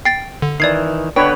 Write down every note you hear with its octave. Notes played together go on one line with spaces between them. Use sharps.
G5 A6 C7
D3
D#3 E3 D5 G#6 C7
D3 B3 D4 B4 C#5 G5